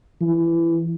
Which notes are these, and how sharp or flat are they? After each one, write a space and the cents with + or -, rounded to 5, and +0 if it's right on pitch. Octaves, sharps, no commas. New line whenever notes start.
E3 +20